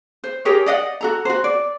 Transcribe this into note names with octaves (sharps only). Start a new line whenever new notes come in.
C5
G4 G#4 A#4 C#5
D5 D#5 F5 F#5
F#4 A4 A#5
F#4 C5
D5